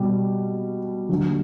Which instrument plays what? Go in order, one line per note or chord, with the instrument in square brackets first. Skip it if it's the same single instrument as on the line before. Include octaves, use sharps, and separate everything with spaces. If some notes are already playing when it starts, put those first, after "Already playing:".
Already playing: [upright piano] B2 G3
D#2 D3 F#3